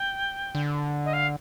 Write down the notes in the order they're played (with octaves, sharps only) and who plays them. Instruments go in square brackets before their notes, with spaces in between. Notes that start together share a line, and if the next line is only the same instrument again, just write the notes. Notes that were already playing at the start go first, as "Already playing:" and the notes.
Already playing: [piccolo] G5
[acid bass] D3
[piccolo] D#5
F5